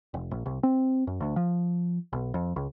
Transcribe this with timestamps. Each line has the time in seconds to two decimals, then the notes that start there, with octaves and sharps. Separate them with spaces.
0.14 F1
0.31 A#1
0.46 C2
0.63 C4
1.07 F#2
1.21 D2
1.36 F3
2.13 B1
2.34 F2
2.56 C#2